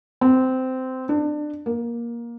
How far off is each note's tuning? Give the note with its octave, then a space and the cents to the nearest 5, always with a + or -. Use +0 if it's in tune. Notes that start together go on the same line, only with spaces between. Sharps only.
C4 -15
D4 +25
A#3 +15